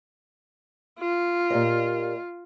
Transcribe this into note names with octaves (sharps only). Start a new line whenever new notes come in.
F4
A#2 G4 D#5